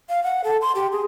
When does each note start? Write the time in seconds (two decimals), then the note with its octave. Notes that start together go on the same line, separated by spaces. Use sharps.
0.09 F5
0.24 F#5
0.44 A4
0.61 C6
0.75 G4
0.92 G#4